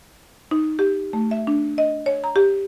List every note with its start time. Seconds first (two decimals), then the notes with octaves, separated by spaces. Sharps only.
0.51 D#4
0.79 G4
1.13 A3
1.31 E5
1.47 D4
1.78 D#5
2.06 C#5
2.24 A#5
2.36 G4